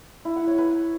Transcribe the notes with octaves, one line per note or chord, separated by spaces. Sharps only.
E4
F#5
C#5
B4